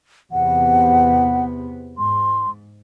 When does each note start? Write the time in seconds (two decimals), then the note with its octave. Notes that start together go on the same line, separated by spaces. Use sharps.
0.32 E2 C3 B3 F#5
1.98 G#2 C6